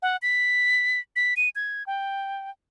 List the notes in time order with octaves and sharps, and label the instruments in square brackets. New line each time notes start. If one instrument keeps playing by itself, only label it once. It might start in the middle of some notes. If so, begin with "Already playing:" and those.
[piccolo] F#5
B6
B6
D#7
G#6
G5